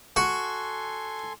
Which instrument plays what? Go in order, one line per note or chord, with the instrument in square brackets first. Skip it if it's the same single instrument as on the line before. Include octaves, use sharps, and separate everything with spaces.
[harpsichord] F#4 [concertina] A4 G#5 C6